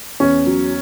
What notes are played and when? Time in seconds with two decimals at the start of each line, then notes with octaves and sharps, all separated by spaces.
0.20 E2 C#4
0.46 F#3